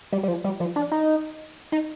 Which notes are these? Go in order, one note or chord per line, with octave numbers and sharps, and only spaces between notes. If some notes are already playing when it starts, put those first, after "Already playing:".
G3
G3
F3
G3
F3
D4
D#4
D#4